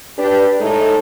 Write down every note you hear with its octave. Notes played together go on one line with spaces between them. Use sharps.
D4 G4 B4
A2 G#3 D#4 A4